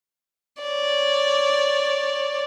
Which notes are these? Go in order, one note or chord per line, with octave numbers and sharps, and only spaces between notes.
C#5 D5